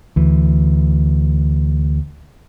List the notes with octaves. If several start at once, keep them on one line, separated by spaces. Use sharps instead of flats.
D2 E3